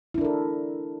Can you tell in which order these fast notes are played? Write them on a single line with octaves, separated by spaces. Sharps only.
E4 D4 A#4 A4